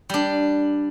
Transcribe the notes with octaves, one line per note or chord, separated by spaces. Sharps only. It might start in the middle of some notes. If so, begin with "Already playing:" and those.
G3 D4